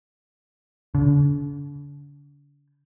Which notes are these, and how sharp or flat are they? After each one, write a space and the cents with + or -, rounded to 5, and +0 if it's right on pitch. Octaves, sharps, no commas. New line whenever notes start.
D3 -40